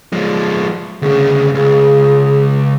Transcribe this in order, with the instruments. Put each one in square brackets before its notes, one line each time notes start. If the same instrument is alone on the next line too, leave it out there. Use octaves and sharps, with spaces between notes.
[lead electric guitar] F3 G#3
[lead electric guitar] D2 C#3 [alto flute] G#4
[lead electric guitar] C#2 [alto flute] G#4